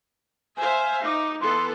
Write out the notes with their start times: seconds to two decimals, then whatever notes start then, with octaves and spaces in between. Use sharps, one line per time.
0.57 C5 E5 F5 G#5
1.05 D#4 D6
1.41 E3 B3 A4 C6